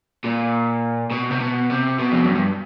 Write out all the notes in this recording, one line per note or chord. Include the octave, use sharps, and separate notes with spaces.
A#2
B2
C3
B2
C3
B2
F2
F#2
G2